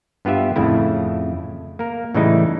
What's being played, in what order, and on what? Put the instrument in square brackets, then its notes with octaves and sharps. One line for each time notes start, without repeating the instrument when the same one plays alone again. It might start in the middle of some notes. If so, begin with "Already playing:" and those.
[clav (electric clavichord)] G2 B3 F4 G4 E5
F2 A2 C#3 A3 E4
A#3 A#4
A2 C#3 E3 G3 D#4 E4